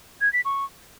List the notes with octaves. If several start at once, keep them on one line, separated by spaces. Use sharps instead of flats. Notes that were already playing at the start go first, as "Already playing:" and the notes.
G#6
B6
C#6